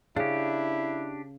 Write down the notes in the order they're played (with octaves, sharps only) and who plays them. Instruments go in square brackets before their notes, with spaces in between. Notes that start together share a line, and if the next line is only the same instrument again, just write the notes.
[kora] C#3 [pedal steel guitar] D4 G4 [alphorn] E4